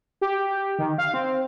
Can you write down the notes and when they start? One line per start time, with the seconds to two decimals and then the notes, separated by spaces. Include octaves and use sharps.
0.21 G4
0.79 D#3
0.98 F5
1.14 C4